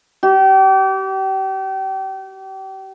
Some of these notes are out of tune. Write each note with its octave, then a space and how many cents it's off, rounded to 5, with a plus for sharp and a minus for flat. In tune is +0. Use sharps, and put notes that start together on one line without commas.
G4 -35